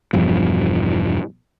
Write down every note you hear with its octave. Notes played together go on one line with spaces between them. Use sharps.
E1 G2 F3